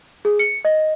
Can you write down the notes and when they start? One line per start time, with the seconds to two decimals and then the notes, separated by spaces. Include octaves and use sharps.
0.25 G#4
0.39 C#7
0.65 D#5